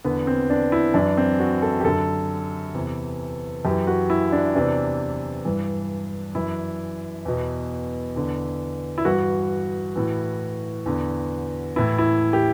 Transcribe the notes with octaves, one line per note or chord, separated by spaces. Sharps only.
E2 D3 B3
C4
D4
E4
F#2 E3 D4
C4
F#4
A4
G4
F#2 D3 A4
E2 C3 E3
F#2 E3 G4
F#4
E4
D4
E2 C3 E3 D4
G2 E3
F#2 E3 E4
E2 B2
E2 D3
E4
G2 E3 F#4
A2 E3
E2 D3
A2 E3 E4
E4
G4